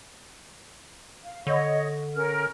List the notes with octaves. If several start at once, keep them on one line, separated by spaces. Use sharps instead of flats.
F5
D3 C#5 D#5 C#6
C#4 A#4 F6